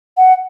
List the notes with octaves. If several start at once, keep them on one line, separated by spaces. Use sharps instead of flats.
F#5